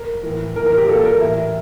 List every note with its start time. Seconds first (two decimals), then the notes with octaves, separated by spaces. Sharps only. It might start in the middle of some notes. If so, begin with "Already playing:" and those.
Already playing: A#4
0.23 A2 E3
0.56 E3 A#4
0.60 A2
0.66 A#4
0.78 G4
0.88 A#2 A4
1.05 A#4
1.21 A2 E3 E4